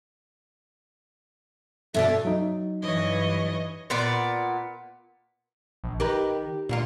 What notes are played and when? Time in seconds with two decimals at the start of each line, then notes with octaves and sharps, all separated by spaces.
1.94 G2 B2 A4 D5 E5
2.25 F#3 D#4
2.82 G2 E3 C#5 D#5
3.90 A#2 B3 D5
5.84 A#1
6.00 D#3 G4 A#4 B4
6.69 D2 A#2 A#3 F4